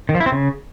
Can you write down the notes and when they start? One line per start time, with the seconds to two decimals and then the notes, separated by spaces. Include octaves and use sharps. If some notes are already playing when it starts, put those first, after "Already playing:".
0.09 D#3
0.15 F3
0.20 E4
0.26 C4
0.32 C#3